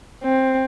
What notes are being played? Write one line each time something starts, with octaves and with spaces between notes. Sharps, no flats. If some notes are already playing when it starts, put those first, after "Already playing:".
C4